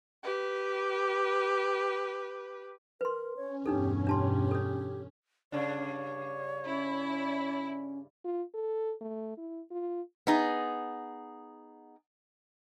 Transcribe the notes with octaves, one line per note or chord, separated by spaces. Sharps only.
G4 B4
A#4 B4 C6
C#4 C#5
E2 G2 B2 D4 D#4 G4 A4
D4 G4 A5 C6
A4 C#5
G2 C#3 D4 C#5
C#4 E4
F4
A4
A3
E4
F4
B3 D#4 G#4